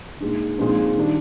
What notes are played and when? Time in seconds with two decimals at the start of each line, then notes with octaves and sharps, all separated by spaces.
0.20 A#2 G#3 D#4
0.58 A#2 F3 G#3 C4 D#4
0.97 D#3 G3 D4